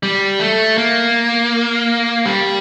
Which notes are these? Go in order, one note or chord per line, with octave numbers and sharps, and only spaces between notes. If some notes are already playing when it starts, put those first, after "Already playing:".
G3
A3
A#3
G3